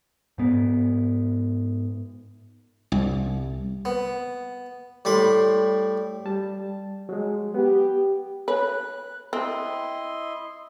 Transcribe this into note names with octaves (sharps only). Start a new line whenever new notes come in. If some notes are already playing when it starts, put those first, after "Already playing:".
G#2 B3
C2
B3
A2 G3 B5 C6
G3 A5
F#3 G#3
B3 G4
B4 C#5 F#6
C4 E4 D#5 C6